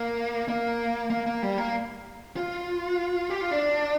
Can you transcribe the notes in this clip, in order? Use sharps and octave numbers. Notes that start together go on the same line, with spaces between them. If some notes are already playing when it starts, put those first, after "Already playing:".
Already playing: A#3
A#3
A#3
A#3
G3
A#3
F4
G4
F4
D4